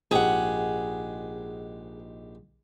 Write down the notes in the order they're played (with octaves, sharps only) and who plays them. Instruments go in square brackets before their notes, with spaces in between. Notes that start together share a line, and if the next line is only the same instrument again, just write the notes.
[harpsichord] A#1 G#2 G4 [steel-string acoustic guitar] G#4 F#5